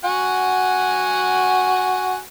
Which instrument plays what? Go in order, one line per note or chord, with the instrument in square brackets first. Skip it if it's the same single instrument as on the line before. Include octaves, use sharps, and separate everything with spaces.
[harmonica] F#4 F#5 G#5